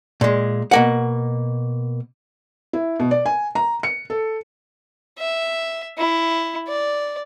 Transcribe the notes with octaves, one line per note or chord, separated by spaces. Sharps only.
A#2 G#3
B2 A#3 F#5
E4
B2
D5
G#5
A#5
C#7
A4
E5
E4
D5